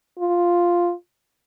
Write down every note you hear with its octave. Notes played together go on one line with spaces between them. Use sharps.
F4